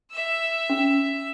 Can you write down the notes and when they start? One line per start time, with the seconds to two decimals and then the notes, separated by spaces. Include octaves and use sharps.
0.11 E5 E6
0.70 C#4